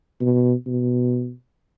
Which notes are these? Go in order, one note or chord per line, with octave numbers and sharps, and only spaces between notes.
B2
B2